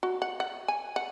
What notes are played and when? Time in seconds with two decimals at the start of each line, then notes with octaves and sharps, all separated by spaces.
0.03 F#4
0.22 F#5
0.40 F#5
0.68 G#5
0.96 F#5